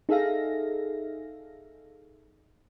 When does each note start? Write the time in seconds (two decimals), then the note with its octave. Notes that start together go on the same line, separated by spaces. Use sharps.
0.09 D#4 G#4 A4 E5 F5 A#6